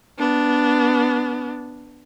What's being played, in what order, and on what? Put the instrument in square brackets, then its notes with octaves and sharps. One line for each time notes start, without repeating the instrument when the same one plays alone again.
[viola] B3 D4